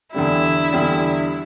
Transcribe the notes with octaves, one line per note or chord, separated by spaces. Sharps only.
E2 D3 G3 E4
E2 D3 G3